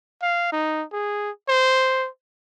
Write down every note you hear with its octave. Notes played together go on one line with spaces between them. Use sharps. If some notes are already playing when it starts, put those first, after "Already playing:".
F5
D#4
G#4
C5